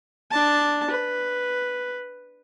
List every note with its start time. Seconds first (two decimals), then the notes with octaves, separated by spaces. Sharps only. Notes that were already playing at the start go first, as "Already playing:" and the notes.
0.31 D4 A5
0.90 B4